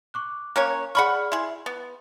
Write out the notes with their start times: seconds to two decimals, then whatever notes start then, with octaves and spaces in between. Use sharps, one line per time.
0.14 C#6 D6 F#6
0.56 A#3 C#4 C#5 A#5 F#6
0.95 G#4 D5 F#5 B5 C#6 F6
1.32 E4 G#4 C6
1.66 B3